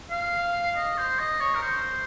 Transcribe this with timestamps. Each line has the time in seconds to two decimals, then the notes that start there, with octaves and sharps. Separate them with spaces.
0.11 F5
0.77 D#5
0.98 C5
1.19 D#5
1.41 C#5
1.55 A#4
1.62 C5